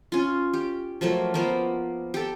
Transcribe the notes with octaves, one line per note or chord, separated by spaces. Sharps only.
C#4 F4
G4
F3 F#3 A3 A#3
F3 A#3 B3
G4 A4